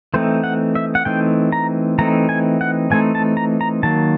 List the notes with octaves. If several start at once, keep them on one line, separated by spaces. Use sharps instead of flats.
E3 A3 C4 D#4 C5
F#5
E5
F#5
E3 A3 C4 D#4 G5
A#5
E3 A3 C4 D#4 A#5
G#5
F#5
E3 A3 C4 D#4 G#5
A5
A#5
A#5
D#3 F#3 A#3 A5